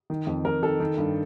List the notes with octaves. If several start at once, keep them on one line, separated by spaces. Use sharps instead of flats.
D#3
F2
F2 A#4
D#3 A4
D#3
G2